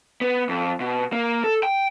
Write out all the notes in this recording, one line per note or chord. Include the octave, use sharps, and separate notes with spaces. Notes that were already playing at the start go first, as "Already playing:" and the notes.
B3
F2
B2
A#3
A4
G5